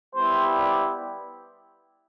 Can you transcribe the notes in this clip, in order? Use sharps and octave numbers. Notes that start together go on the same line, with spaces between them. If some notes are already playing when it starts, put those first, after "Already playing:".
G3 B3 E4 G4 C5
D5